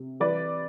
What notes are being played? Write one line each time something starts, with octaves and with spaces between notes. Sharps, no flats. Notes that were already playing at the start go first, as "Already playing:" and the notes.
Already playing: C3
E3 B4 D5